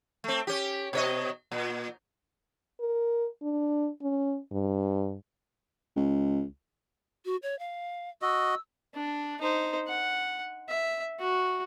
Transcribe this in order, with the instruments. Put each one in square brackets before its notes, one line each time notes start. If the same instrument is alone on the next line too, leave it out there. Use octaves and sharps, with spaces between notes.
[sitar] A3 C4
C#4 G4
B2 C#5 D#5
A#2
[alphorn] A#4
D4
C#4
G2
[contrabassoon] C#2
[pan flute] F#4
C#5
F5
[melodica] F#4 D#5 [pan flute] E6
[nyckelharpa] D4
D#4 C5
F#5
E5
F#4